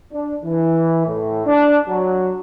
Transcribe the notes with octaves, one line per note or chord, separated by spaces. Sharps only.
D4
E3
A2
D4
F#3